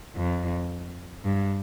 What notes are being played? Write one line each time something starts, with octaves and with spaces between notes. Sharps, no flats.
F2
G2